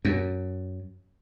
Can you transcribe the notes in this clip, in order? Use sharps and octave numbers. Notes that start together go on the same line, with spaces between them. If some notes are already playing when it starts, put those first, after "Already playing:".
F#2